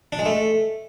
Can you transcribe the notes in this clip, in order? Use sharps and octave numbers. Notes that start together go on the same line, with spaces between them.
D4
G#3
A3